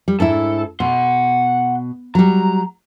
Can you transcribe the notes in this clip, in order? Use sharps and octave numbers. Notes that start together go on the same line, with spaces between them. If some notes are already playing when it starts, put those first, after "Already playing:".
G3
G#2 D4 E4 A4
B2 F#5 C6
F#3 G3 A#5